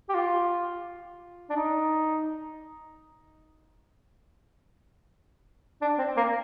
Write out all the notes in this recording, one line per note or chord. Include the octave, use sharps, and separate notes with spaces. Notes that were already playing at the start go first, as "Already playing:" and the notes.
G4
F4
D4
D#4
D4
C4
A#3